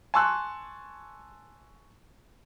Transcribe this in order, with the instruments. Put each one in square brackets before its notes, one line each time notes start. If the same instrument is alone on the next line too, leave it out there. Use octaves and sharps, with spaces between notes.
[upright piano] G#5 A5 C6 C#6 E6 F#6